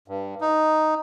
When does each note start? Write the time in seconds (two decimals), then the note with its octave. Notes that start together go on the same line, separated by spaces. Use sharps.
0.08 G2
0.41 D#4